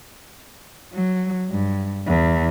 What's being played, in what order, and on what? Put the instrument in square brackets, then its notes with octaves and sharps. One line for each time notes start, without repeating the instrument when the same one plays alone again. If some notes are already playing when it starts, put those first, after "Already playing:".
[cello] F#3
G2
E2